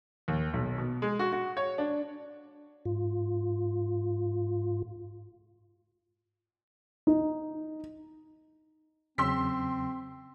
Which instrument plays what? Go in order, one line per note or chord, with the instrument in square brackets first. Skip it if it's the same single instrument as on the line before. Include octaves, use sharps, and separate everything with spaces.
[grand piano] D#2
B1
B2
G#3
F#4
F#4
C#5
D4
[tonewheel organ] G#2 F4
[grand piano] D#4
[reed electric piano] E2 C#3 F#3 [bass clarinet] C4 [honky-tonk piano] C6 E6 B6